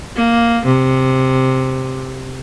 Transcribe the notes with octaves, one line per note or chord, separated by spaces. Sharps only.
A#3
C3